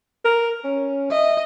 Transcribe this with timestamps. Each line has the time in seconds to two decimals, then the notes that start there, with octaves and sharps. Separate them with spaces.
0.25 A#4
0.64 C#4
1.11 D#5 E5